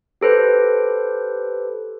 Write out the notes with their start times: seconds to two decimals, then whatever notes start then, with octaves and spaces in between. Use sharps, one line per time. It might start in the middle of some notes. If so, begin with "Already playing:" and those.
0.21 G4 A4 B4 C5